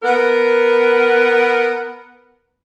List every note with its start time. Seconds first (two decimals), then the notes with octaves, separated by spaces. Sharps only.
0.03 B3 A#4